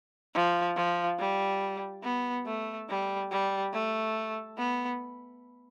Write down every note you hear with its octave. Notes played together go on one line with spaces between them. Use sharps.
F3
F3
G3
B3
A3
G3
G3
A3
B3